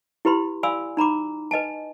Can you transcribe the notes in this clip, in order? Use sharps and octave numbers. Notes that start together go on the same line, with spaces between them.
E4 G4 B4 B5 C6
D5 F5 G#5 B5 C6 E6
D#4 A#5 B5 D6
B4 D#5 G#5 A5